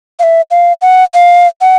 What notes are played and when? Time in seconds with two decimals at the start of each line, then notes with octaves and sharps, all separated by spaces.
0.19 F5
0.23 E5
0.51 F5
0.82 F#5
1.14 F5
1.61 F#5